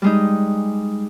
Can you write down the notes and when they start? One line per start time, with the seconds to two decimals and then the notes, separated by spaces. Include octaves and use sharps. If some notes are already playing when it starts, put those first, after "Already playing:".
0.02 G3 G#3 D#4